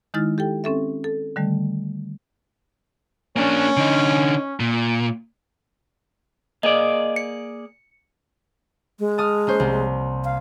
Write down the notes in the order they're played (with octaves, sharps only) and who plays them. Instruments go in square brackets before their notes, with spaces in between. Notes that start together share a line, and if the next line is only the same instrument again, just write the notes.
[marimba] D#3 G#3 D#4 E4 F6 A6
G4 A4 G5
C4 C#4 A4 E5
A4
D3 D#3 G3 A3
[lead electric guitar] A#3 D4 [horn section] C#4
[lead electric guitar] D3 D#4
A#2
[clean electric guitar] A#3 G#4 D5 [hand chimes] D#5
[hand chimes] C#7
[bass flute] G#3
[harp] A5 D#6 F6
A#3 C#4 C5
C2
[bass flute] F5